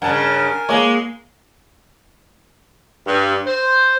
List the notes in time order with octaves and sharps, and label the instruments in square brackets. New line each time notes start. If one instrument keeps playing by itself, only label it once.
[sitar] G2 C#3 [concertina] A#4 G#5 [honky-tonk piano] F#5 A5
[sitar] G#3 [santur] A#3 [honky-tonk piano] C#5 G#5 A#5
[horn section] G2
C5